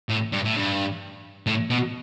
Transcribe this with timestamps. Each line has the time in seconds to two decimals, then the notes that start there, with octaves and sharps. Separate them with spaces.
0.09 A2
0.32 G2
0.45 A2
0.56 G2
1.47 A2
1.70 B2